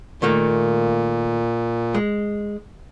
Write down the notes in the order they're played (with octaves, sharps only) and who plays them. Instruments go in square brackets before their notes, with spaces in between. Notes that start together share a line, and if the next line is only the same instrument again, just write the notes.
[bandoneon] A#2 [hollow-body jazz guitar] D#3 A3 A#3
[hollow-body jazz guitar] G#3